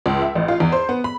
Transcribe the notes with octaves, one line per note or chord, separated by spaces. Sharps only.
C#2
E5
A1
F4
E2
C5
B3
B5